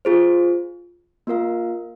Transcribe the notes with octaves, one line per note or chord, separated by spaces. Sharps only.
F4 G#4 C5
A#3 F4 A#4 F5